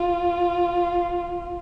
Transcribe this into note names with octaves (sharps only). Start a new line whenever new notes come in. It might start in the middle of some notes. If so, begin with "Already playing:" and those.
Already playing: F4